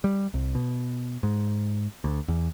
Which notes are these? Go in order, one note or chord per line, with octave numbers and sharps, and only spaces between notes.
G3
C2
B2
G#2
D2
E2